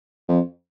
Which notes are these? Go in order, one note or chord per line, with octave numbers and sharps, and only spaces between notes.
F2